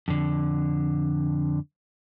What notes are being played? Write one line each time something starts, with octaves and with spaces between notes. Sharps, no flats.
F2 D3